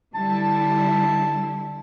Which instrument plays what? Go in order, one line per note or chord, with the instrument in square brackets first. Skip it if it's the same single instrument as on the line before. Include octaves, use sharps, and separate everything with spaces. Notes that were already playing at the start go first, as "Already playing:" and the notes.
[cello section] D3 G3 E4 [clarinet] A5